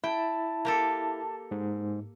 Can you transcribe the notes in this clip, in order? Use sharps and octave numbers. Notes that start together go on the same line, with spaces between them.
E4 G5 A5
A#3 G4 A4
G#2